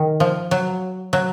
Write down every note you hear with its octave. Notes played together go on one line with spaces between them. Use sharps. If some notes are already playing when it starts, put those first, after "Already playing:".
Already playing: D#3
F3
F#3
F#3